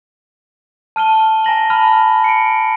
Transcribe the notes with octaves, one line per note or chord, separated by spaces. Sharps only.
A5 F6 D#7 G7
G#5 A#5 A#6 F#7
A5 B5 F6
C#7 D7